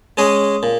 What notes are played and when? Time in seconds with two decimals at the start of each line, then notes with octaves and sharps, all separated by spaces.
0.17 G#3 C#4 G#4 D#5
0.63 A#2